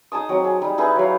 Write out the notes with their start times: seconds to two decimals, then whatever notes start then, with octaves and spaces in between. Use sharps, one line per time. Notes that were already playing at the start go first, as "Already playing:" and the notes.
0.12 D#4 G#4 A5 D#6
0.29 F#3 C4
0.44 G#4
0.62 G3 D#4
0.78 D#4 E4 G#4 B4
0.96 F#3 F5